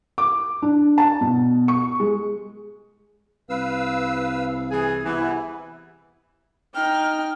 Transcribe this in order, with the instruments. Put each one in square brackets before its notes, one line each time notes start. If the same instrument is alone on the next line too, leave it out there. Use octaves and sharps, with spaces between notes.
[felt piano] D6
D4
A5
B2
C#6
G#3
[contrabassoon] C2 [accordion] B4 F5 E6
[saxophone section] E3 G#4
[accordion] C3 B3 E4 [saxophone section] E3
[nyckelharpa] D#4 G5 [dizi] F6